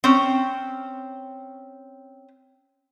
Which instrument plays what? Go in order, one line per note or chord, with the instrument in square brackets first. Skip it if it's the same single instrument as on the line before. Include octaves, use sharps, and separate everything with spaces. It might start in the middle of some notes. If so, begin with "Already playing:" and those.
[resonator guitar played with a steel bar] C4 C#4